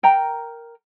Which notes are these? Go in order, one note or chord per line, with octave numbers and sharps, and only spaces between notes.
A#4 G5 A#5